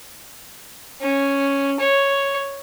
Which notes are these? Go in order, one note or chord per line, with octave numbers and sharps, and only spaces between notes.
C#4
C#5